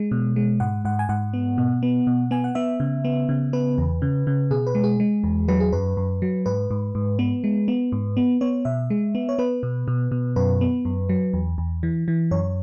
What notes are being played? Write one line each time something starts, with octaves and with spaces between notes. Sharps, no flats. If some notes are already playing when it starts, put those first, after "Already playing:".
Already playing: G#3
B2
G#3
G#2 F#5
G#2 F#5
G#5
G#2 F#5
B3
B2
B3
B2
B3 G#5
F#5
B3 E5
C#3
B3
C#3
B3 B4
E2
C#3
C#3
B2 G#4
B4
G#3
G#4
G#3
E2
F#3 B4
G#4
F#2 B4
F#2
F#3
G#2 B4
G#2
G#2
B3
G#3
B3
G#2
B3
B3 C#5
B2 E5
G#3
B3
C#5
B3 B4
B2
B2
B2
F#2 B4
B3
F#2
F#3
E2
E2
E3
E3
F#2 C#5